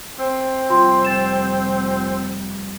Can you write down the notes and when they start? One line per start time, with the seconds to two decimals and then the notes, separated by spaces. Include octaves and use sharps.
0.19 C4
0.70 F1 G3 F4 G5 C6
1.05 G5 A6 E7